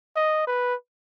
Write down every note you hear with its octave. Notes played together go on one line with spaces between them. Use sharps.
D#5
B4